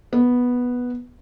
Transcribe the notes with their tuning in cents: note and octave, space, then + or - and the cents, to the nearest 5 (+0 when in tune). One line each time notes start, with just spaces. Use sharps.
B3 -5